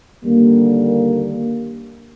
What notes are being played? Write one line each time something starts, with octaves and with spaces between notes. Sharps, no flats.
D#2 D3 G3 A#3